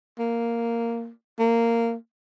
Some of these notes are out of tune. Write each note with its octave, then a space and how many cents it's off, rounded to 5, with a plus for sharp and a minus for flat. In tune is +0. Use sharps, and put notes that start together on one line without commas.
A#3 -5
A#3 -15